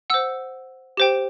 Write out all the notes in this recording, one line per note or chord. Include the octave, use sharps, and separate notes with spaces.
C5 F#5 E6
G4 C5 G5